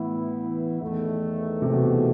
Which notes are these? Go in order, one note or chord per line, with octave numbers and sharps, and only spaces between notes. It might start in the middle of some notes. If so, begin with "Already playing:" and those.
Already playing: A2 E3 B3 E4
E2 D#3 A3
C3
B2